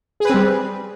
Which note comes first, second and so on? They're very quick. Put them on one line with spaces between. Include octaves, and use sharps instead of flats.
G#4 B4 C4 G3